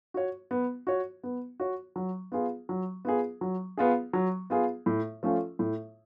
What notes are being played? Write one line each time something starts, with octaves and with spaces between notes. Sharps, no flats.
F#4 C#5
B3
F#4 C#5
B3
F#4 C#5
F#3
B3 F4 G#4
F#3
B3 F4 G#4
F#3
B3 F4 G#4
F#3
B3 F4 G#4
A2
F3 A3 C#4 F4
A2